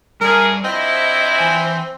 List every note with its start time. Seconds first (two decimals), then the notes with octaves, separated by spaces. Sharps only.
0.21 E2 G3 C#4 G#4 A#4 A5
0.64 F3 C4 D4 E4 D#5
1.38 E3 G#5